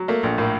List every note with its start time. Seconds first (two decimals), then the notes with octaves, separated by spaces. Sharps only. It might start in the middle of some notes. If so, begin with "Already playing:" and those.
Already playing: F#3
0.08 A3 A#3
0.23 A#1
0.38 A2 A#3